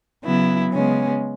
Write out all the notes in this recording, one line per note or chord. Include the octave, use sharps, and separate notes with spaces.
C#3 F#3 B3 E4
C#3 G#3 B3 C#4